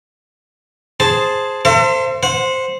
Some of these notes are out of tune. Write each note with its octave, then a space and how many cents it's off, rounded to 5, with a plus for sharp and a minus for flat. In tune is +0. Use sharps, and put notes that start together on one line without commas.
G#4 +0 C5 +0 A5 -5
A4 +45 C5 +0 E5 +45
C5 +0 F#5 -25